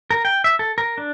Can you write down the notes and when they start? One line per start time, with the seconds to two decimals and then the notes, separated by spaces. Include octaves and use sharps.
0.11 A#4
0.25 G5
0.44 E5
0.59 A4
0.78 A#4
0.98 D4